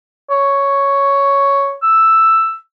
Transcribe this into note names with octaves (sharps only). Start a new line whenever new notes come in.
C#5
E6